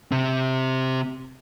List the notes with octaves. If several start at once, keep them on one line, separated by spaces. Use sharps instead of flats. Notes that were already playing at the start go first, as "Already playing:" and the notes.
C3 C4